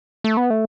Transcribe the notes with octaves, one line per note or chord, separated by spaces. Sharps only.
A3
B3
A3